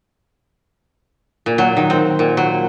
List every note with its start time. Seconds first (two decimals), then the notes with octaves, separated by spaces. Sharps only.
1.46 A#2
1.58 F#3
1.77 D#3
1.90 C4
2.19 A#2
2.37 F#3